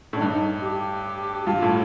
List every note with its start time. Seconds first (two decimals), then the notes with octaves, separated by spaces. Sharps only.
0.13 A2
0.17 D4
0.21 G2 D#4
0.62 G4
1.47 G2 F4
1.62 A2